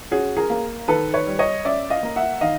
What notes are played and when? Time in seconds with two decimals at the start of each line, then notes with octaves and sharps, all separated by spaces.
0.11 C#4 F#4 G#4
0.37 G#4 A#4
0.50 A#3
0.88 D#3 A4 B4
1.14 B4 C#5
1.27 G3
1.39 C#5 D#5
1.65 C#4 D5 E5
1.90 D#5 F5
2.03 A#3
2.16 E5 F#5
2.41 D#3 D#5 F5